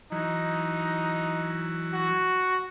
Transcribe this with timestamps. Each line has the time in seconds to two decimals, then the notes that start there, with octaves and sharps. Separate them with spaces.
0.12 E3 F#3 D#4
1.94 F#4